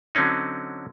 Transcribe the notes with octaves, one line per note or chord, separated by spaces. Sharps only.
D3 F#3 C4 C#4 D#4